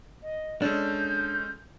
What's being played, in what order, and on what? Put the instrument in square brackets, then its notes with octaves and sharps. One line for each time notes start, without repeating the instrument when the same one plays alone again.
[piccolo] D#5
[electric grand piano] G#3 C#4 A4 [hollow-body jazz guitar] D4 [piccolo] G6